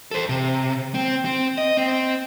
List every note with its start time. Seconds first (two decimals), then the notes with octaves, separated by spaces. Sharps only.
0.11 A4 C5
0.29 C3
0.94 C4
1.25 C4
1.58 D#5
1.77 C4